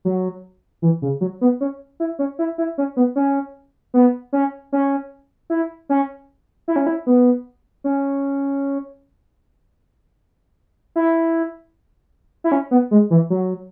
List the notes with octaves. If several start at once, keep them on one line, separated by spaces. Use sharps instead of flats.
F#3
E3
C#3
F#3
B3
C#4
E4
C#4
E4
E4
C#4
B3
C#4
B3
C#4
C#4
E4
C#4
E4
C#4
E4
B3
C#4
E4
E4
C#4
B3
G#3
E3
F#3